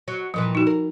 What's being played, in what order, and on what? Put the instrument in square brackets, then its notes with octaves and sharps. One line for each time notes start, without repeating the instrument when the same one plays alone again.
[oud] F#3
[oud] G2 A#2 E3 [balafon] F3
[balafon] D#4 F#4
[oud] A#4